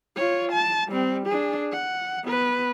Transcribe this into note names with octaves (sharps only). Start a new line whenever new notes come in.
F4 C#5
A5
G3 C4
D4 G#4
F#5
B3 B4